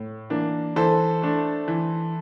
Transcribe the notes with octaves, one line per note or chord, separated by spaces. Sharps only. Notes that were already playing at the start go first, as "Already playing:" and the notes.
Already playing: A2
E3 A#3 D4
E3 A4 C5
A3 D4
E3